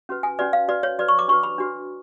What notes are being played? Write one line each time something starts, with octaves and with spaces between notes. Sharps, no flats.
C#4 F#4 B4
G#5
C#4 F#4 B4 D5
F5
F#4 B4 D5
C#5
F#4 B4 D5
C#6
D6
D4 F#4 B4 C#6
B5
D4 F#4 B4